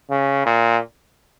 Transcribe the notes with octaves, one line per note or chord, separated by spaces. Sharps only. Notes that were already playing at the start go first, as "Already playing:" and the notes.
C#3
A#2